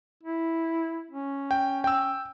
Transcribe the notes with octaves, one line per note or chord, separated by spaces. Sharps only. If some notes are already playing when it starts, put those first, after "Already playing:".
E4
C#4
G5
G5 E6